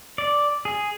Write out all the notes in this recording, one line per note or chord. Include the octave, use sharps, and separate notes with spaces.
D5
G#4